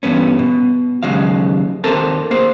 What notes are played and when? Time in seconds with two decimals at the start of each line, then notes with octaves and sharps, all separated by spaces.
0.03 E2 G2 B3 C#4
0.39 B2
1.03 D#2 C#3 F#3 G#3 F5
1.84 D#2 C4 A4 A#4 A5
2.31 A#3 G#4 C5